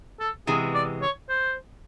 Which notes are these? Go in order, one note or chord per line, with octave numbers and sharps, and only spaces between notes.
A4
C3 E3 G#3 B3 G#4
D5
C#5
C5